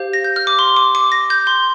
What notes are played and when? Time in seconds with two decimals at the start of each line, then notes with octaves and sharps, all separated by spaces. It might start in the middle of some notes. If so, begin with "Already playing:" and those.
Already playing: G4 C5 F5
0.13 A#6
0.24 G6
0.36 F6
0.47 D6
0.59 C6
0.76 D6
0.95 D6
1.12 A#6
1.30 G6
1.47 C6